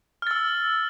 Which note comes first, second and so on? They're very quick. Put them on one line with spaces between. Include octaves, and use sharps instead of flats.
F6 A6 E6